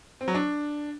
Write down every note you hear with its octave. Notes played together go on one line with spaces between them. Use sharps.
C4
F#3
D4